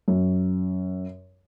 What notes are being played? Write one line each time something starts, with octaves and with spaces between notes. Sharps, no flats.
F#2